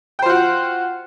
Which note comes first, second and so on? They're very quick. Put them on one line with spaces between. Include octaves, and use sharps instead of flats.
G5 C5 F4 F#4